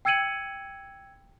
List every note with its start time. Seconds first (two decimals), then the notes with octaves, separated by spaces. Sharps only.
0.05 G5 E6 G#6 C#7 D#7 F#7